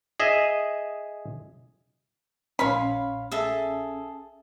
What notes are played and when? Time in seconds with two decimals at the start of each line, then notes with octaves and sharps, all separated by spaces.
0.20 G#4 D#5 E5
2.59 A#1 C#4 C#5 F5 B5 C6
3.31 G#4 A4 E5